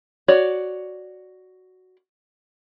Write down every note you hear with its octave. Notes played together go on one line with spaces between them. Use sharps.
F#4 C#5 D5